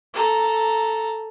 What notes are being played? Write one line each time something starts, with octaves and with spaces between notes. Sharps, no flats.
A4 A#5